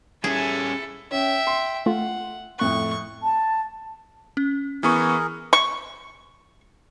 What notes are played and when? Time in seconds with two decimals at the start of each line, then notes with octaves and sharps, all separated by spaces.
0.24 G3 C#4 E4 G#4 A4
1.11 C#4 E5 G5
1.47 C6
1.86 A3 F4 F#5
2.59 F2 A2 C#6 F#6
3.23 A5
4.37 C#4
4.83 E3 B3 G#4 A#4 C#6
5.53 C#6